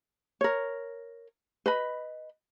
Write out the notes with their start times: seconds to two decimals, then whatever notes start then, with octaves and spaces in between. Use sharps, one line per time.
0.41 A#4 C#5
1.66 B4 D#5 B5